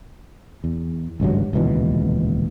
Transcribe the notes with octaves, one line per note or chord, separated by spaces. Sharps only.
E2
G#1 C#2 G2 F#3
D#1 C#2 B2 E3